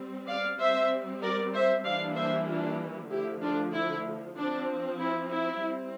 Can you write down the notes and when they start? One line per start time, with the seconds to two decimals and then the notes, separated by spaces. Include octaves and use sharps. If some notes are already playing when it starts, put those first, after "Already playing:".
Already playing: G3 C4
0.28 D5 F5
0.60 G3 C4 C5 E5
1.22 A#4 D5
1.53 C5 E5
1.85 E3 G3 A#3 D4 D5 F5
2.16 C5 E5
2.48 D4 F4
3.10 D3 F3 A3 E4 G4
3.42 D4 F4
3.73 E4
4.36 F3 C4 D4
4.99 E4
5.30 E4
5.61 G3 C4